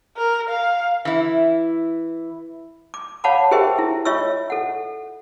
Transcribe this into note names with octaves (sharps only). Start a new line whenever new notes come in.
A#4
F5
E3 E4
D6
C#5 F5 F#5 A5 B5 D6
G4 G#4 A#4 C5 E5 G5
E4
F4 C#5 D#5 E5 C#6 E6
A4 F#5